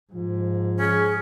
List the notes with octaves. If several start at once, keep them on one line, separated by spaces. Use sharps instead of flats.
G#2 F3
C#4 G#4